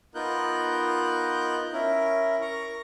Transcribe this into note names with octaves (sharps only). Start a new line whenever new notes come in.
B3 D#4 F4 A#4 F#6 G6
C#4 E4 A#4
A#4 A#5 C#6